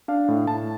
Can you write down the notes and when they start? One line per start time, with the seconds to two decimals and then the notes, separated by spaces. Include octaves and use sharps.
0.08 D4 F5
0.28 A2
0.47 A2 A5